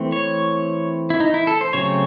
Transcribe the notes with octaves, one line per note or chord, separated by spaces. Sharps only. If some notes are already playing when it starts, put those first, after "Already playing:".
Already playing: E3 A3 C4
C#5
E4
D#4
E4
A4
C5
C#3 F#3 A3 C4 C#5